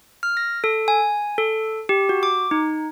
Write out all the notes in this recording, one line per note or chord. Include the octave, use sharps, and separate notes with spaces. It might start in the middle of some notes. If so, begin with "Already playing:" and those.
F6
A#6
A4
G#5
A4
G4
F#4
D6
D#4